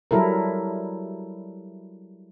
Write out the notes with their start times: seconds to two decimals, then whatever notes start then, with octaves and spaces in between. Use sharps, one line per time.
0.11 F#3 G3 E4 A4 A#4